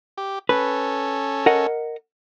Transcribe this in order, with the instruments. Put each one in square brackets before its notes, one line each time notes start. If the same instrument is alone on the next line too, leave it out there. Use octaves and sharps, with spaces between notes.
[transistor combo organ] G4
[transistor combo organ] C#4 A4 [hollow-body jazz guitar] B4
[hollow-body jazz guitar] A#4 D#5 F#5